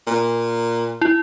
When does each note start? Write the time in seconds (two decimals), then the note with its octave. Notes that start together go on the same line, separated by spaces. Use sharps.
0.07 A#2
1.02 E4